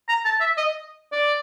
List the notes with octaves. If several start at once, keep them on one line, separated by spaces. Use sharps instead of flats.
A#5
A5
E5
D#5
D5